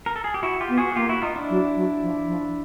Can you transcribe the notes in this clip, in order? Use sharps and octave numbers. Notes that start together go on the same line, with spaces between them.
A#4
A4
G#4
G4
E4 F#4
F4 G4
B3
F#4 G#4
F#4
A#3 F4 G4
E4 F#4
D#4 F4
D4 E4
F#3
F#3
F3
F3